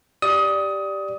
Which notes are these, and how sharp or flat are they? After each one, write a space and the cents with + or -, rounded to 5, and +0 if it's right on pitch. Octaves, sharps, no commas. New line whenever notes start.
G4 +0 D5 +0 D#6 +20